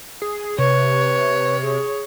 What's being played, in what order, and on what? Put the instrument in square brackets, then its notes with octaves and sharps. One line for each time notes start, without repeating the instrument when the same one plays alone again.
[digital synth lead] G#4
[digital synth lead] C3 [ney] B4 [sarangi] C#5
[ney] G#4